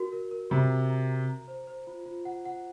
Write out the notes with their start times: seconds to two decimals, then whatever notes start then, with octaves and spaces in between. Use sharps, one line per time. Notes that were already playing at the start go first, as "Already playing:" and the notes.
Already playing: F#4 A#4
0.12 A#4
0.31 A#4
0.50 C3 F#4
0.70 A#5
0.90 A#5
1.09 A#5
1.29 A#5
1.48 C5
1.67 C5
1.87 F4
2.06 F4
2.25 F#5
2.45 F#5